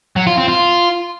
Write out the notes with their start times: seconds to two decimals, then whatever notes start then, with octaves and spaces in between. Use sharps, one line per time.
0.16 F#3
0.27 F4
0.37 C4
0.48 F4